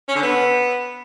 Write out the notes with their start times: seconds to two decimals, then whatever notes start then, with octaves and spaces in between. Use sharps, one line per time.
0.09 C#4
0.15 D3
0.22 B3